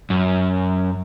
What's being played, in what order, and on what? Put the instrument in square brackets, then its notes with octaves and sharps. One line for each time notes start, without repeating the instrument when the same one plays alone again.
[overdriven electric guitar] F#2